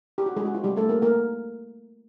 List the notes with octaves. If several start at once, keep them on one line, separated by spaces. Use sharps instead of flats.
G4
F#4
G#3 G#4
F#4
F4
G3 G4
A3 A4
A#3 A#4
A#3 A#4